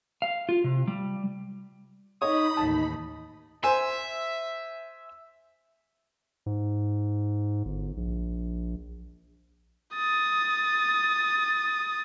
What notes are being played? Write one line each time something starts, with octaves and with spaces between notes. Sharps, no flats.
F5
F4
C3
G3
D#4 C#5 D#5 B5 D#6
A1 D#2 A5
C5 E5 G#5
G#2
G1
A#1
D#6 A6